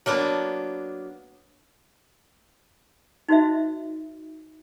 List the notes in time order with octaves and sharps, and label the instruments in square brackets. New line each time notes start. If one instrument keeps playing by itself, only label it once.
[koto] F#3 A#3 B3 D4
[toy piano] D#4 F#4 C5 D#5 E5